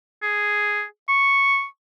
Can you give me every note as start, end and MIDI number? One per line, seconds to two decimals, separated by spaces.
0.23 0.84 68
1.09 1.65 85